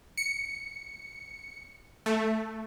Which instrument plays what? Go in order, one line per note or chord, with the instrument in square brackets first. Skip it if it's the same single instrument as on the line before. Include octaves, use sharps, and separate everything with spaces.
[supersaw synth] C#7
A3